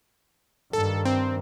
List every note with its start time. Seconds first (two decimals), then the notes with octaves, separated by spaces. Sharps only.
0.73 G2 D#3 A4
1.05 C4